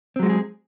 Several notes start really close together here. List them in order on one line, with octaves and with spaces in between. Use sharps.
C4 F#3 G#3 F#4 G#4